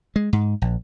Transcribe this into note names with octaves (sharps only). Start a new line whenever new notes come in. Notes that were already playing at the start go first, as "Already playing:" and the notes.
G#3
G#2
A#1